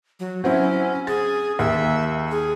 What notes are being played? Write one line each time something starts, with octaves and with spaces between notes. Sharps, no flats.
F#3
F#3 C4 C#4 E4
G#4 A6
D#2 E5
G#4